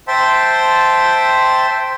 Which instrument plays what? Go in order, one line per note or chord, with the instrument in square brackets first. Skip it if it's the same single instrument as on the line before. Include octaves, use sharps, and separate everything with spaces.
[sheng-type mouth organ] C5 E5 G5 A5 C6